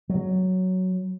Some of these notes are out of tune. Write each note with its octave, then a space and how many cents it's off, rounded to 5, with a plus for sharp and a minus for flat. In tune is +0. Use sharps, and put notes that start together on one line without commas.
F#3 +5